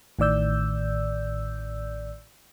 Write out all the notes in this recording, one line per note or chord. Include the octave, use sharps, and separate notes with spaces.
A1 A2 D#3 D5 E6 G6